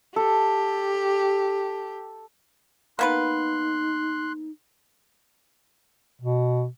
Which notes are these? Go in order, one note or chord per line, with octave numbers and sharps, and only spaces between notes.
G4 A4
A#3 B3 D#4 B4 C6 F#6
B2